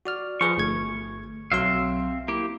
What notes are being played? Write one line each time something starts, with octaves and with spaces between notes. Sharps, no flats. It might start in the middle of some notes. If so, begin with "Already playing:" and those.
F#4 D5 F6
F3 G#4 B4 C#6
G1 A3 G#6
B1 F#3 C4 E5 F5 C6
A#3 E4 G4